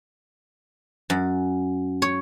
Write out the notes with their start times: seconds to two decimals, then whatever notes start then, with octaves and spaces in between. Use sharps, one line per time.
1.10 F#2
2.02 C#5